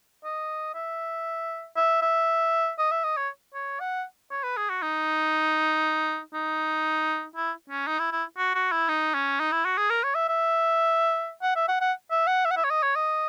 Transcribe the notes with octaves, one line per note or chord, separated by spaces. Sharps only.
D#5
E5
E5
E5
D#5
E5
D#5
C#5
C#5
F#5
C#5
B4
G#4
F#4
D#4
D#4
E4
C#4
D#4
E4
E4
F#4
F#4
E4
D#4
C#4
D#4
E4
F#4
G#4
A#4
C#5
E5
E5
F#5
E5
F#5
F#5
E5
F#5
E5
F#5
E5
C#5
D#5
C#5
D#5